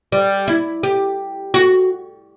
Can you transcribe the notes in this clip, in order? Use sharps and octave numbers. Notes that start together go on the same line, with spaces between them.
G3
E4
G4
F#4